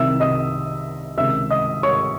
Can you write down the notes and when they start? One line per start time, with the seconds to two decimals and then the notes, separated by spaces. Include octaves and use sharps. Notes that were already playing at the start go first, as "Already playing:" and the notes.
Already playing: C2 C3 D#3 E5 E6
0.20 D#5 D#6
1.17 C#2 C3 D#3 E5 E6
1.50 D#5 D#6
1.83 C#5 C#6